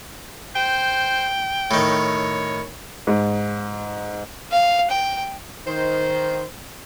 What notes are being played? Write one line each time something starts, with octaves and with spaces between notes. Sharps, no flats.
C5 G5
A2 D#3 C#5
G#2
F5
G5
D#3 C5